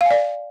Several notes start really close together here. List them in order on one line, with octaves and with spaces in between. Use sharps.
F5 G#5 D5